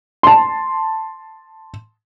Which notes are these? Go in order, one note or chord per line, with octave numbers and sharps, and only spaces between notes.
A5 C6